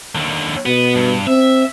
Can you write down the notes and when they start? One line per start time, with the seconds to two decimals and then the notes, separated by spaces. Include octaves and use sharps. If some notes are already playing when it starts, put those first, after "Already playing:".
0.15 D#2 D3
0.66 B2 B3
0.96 G2
1.27 C4 E5